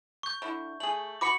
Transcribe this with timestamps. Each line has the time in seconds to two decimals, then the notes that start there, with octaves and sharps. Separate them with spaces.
0.23 C#6 G6
0.42 D3 D4 E4
0.80 A3 G#4 F#7
1.21 F#4 B5 C#6 D6 C#7 F#7